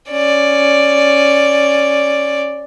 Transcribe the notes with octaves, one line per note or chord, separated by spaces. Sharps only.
C#4 D5